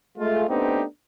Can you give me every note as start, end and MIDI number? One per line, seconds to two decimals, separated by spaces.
0.18 0.45 56
0.18 0.45 57
0.18 0.45 65
0.49 0.84 57
0.49 0.84 59
0.49 0.84 60
0.49 0.84 62
0.49 0.84 63
0.49 0.84 67